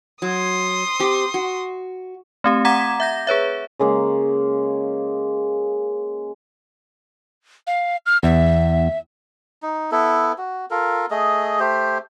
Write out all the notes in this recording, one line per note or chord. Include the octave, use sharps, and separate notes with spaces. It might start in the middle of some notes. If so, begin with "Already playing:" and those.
F#3 C6 D#6
C4 G4
F#4
A3 C4 G4
F#5 A#5 D6 G#6 B6 E7
E5 G6 A#6
G#4 B4 C#5 E5
C#3 G#3 A#3
F5
F6
E2 E5
D#4
B3 E4 A4
F#4
F4 A4 A#4
A3 G#4 D#5
A3 G4 C5